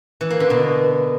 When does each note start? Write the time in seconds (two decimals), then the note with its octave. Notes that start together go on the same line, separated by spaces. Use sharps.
0.21 E3
0.30 A#3
0.40 D3
0.50 B2